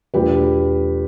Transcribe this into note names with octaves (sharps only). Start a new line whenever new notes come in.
E2 B2 A3 D4 F4 G4 B4